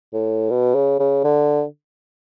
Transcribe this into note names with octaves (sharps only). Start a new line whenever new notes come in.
A2
B2
C#3
C#3
D3